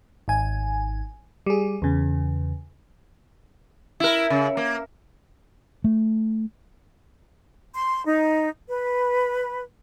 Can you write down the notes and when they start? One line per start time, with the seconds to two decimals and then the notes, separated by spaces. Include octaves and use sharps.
0.28 G#1 G#5
1.46 G3 G#4
1.82 E2 C#3
4.00 E4 A#4
4.30 C#3
4.57 A#3
5.84 A3
7.74 C6
8.05 D#4
8.68 B4